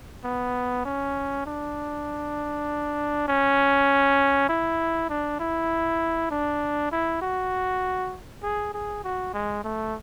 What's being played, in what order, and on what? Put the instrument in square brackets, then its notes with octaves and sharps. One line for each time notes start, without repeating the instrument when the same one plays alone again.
[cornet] B3
C#4
D4
C#4
E4
D4
E4
D4
E4
F#4
G#4
G#4
F#4
G#3
A3